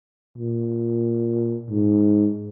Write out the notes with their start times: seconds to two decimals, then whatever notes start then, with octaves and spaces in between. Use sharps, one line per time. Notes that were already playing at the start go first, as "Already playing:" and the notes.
0.38 A#2
1.70 G#2